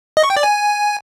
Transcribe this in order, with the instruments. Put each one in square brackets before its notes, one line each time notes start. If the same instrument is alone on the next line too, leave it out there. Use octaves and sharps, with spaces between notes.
[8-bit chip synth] D#5
C#6
G5
D5
G#5